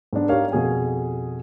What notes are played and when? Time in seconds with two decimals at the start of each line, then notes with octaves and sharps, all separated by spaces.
0.13 G#2 G#3 B3 D4
0.28 D#4 G4 A#4 C#5 F5
0.52 F2 B2 G#4 G#5